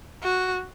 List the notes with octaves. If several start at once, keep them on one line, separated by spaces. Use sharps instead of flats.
F#4